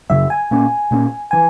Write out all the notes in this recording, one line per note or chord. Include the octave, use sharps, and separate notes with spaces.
F#2 C#3 F#3 E5
G#5
A#2 A#3 C#4
A#2 A#3 C#4
E3 G#5